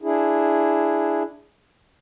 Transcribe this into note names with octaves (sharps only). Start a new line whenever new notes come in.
D4 E4 G#4